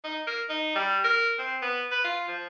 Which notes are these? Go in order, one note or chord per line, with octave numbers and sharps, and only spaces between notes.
D#4
A#4
D#4
G3
A#4
C4
B3
B4
F4
F3